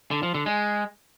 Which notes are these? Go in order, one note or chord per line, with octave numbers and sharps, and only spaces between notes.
D3
F3
D3
G#3